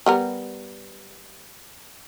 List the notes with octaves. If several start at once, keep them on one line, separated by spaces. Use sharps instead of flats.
G3 B3 A#4